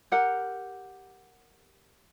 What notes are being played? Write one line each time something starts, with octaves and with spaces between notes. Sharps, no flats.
G4 A#4 F#5